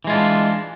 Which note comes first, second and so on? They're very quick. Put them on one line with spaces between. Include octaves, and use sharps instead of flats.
E3 G#3 F4 D4